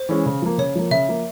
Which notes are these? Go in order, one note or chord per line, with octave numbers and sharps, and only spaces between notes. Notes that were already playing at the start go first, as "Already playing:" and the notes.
Already playing: C5
E3 G#3 C#4
C#3
F3 A#3
C#3 C#5
F3 A#3
C#3 E5
F3 A#3